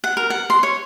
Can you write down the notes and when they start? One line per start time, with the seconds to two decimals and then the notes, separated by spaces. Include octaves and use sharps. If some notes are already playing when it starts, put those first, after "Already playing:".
0.04 F#5
0.17 A#4
0.30 F#5
0.50 C6
0.63 C#5